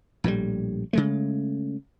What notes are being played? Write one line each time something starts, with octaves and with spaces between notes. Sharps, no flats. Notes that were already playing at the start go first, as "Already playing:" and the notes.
A#1 A2 D3 G3
C#3 G#3 A3